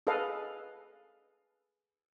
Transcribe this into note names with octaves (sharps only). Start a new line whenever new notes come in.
G#4 A4 B4 D#5 F5